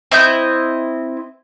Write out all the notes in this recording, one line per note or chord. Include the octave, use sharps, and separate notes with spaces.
C4 E4 D#5 G6